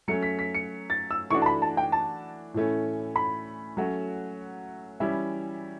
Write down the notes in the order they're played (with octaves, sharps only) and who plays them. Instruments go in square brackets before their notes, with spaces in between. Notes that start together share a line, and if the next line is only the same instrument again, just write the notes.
[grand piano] F#3 A3 C#4 [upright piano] C#7
[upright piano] B6
B6
C#7
A6
E6
[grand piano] E3 A3 D4 F#4 [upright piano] C#6
[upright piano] A5
B5
A5
G5
A5
[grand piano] A2 E3 A3 C#4
[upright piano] B5
[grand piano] F#3 A3 C#4 F#4
[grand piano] E3 G3 C#4 E4 [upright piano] E5